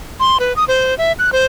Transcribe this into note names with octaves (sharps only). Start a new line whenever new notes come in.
C6
B4
D#6
C5
E5
F#6
C5